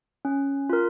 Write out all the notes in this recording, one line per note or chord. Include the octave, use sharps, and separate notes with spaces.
C#4
F4 A#4